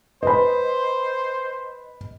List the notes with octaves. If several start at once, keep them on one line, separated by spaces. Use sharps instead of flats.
B4 C5 D#5 B5